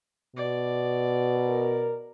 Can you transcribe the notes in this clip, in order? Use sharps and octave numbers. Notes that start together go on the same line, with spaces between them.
B2 D5
A#4